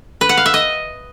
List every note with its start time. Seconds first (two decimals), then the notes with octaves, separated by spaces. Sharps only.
0.21 B4
0.29 F#5
0.37 F5
0.46 E5
0.54 D#5